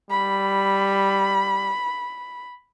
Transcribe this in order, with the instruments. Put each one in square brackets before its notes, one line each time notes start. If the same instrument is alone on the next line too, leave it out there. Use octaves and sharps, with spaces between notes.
[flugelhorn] G3 [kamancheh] B5